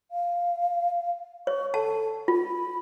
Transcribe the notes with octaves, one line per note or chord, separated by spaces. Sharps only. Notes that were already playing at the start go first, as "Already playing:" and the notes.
F5
C#5 C#6
A4 A5
F4 B5